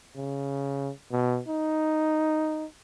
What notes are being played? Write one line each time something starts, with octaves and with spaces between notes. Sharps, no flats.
C#3
B2
D#4